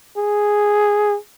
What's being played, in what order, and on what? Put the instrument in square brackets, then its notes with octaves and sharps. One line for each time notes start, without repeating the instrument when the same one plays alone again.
[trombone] G#4